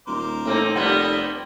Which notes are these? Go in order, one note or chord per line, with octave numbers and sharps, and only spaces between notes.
D#1 A#4 C5 D6
A2 A#3 C4 D#4
F1 G3 A#3 B3 A4 C5 G5